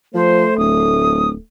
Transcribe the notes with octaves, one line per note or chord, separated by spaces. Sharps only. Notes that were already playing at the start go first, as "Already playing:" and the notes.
F3 A3 C5
D1 D#6